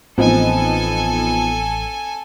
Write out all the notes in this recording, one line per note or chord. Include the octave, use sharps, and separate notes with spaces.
A1 F3 B3 C4 D#4 A4 G#5